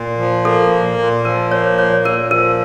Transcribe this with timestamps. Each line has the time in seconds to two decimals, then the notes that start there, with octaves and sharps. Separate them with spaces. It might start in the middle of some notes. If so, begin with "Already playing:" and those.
Already playing: A#2
0.18 F3
0.45 A#3 A4
0.71 A#2
0.98 A#2
1.25 F3 A#4
1.51 A#3 C#5
1.78 A#2 C#5
2.05 A#2 A#4
2.31 F3 A#4